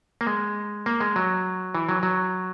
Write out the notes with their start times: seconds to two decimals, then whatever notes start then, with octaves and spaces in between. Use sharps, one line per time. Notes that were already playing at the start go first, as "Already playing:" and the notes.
0.21 A#3
0.27 G#3
0.86 A#3
1.00 G#3
1.16 F#3
1.75 E3
1.89 F#3
2.03 F#3